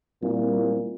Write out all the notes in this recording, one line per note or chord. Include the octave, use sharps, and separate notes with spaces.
A#2 G3 C4 E4